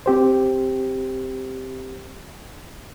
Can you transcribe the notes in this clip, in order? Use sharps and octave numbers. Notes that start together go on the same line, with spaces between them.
C4 G4 C5